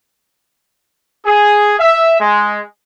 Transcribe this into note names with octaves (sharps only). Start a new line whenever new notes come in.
G#4
E5
G#3